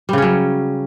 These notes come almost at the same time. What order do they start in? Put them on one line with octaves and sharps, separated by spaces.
G3 C#3 C#4 F#3